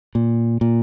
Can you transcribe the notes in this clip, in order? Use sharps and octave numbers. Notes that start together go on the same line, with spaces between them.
A#2
A#2